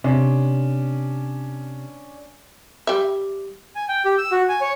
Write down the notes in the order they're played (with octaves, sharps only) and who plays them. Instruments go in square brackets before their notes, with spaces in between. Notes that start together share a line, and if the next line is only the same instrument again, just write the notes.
[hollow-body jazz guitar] C3 [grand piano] C#4 D4
[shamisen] G3 E5
[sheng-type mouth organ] G#5
G5
G4
E6
F#4
G#5
C#5